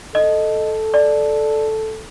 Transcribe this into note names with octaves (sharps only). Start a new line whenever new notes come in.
A4 D#5
D5